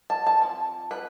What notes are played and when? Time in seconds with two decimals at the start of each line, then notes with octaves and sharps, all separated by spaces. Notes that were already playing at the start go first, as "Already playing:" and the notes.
0.10 A5
0.27 A5
0.41 F3 C4
0.91 B4